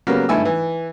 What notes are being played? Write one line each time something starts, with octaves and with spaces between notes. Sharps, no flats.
C#3 F#3 G3 A#3 B3
G#1 G2 A3 E4 G#5 E6
E3